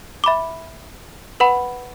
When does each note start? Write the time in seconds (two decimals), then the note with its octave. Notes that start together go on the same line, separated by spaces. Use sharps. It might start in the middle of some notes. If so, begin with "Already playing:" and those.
0.24 E5 B5 D6
1.40 B4 F#5 B5